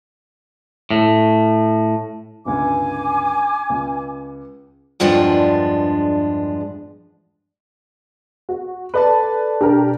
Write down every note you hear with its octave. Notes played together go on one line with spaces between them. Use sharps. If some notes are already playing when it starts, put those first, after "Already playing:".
A2
G1 C#2 G#5 D6
C#2
E2 G2 F3 G#3 D4
F#4
A4 B4 D5 A5
B2 D4 G4 A#4